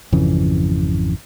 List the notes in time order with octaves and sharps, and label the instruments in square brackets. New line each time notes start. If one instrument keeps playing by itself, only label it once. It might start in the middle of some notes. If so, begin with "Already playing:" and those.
[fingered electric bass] G#1 F2 C#3 E3